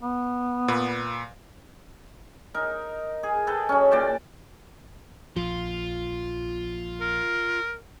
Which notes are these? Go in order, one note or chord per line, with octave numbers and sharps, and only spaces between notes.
B3
A#2 B4
D#4 A#4
G#4
G#4 A4 B4 G5
F#3 C#4
A#2 D5 G5 A5
A#1 F3 F4
A#4